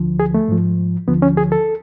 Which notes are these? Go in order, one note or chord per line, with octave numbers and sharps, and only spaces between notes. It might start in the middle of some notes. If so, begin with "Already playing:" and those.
Already playing: D2 D3 F3
G#4
A3
G#2 F3
D2 D3 F3 B3
C#4
G#4
A4